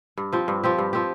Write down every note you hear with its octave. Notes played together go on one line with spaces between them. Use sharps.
G2
F3 C4 G4
G2
F3 C4 G4
G2
F3 C4 G4